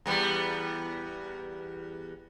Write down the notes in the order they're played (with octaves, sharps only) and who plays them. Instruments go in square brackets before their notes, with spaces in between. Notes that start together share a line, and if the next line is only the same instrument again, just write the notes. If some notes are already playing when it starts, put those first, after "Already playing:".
[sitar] E2 G3 B3